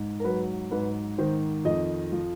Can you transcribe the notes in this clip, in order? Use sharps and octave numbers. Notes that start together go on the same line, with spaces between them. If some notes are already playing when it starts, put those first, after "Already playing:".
Already playing: G#2
A#4
F#3 B4
G#2 B4
D#3 C5
F2 D#5
F3